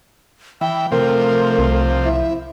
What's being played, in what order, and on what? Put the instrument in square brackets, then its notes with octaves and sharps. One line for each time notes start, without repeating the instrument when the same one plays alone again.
[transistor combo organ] E3 [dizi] G5
[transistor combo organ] C3 F3 [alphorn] A3 [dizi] A#4
[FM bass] C2
[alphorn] E4 [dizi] E5